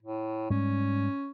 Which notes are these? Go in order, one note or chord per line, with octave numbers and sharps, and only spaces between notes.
A2
G#2 G3 C#4